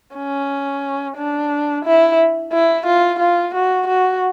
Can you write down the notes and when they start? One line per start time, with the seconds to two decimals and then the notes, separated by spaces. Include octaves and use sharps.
0.16 C#4
1.17 D4
1.86 E4
2.53 E4
2.87 F4
3.20 F4
3.55 F#4
3.88 F#4